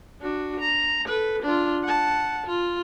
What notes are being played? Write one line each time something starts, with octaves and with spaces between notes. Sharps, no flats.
D4 F#4
A#5
A4 B4
D4 F4
F#5 A5
F4